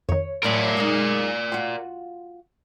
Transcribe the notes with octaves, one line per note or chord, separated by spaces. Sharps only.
F2 D#3 C#5
E2 A2 F#3 A#4 D5
F#2 G#3 D#4
F4 F#4 G5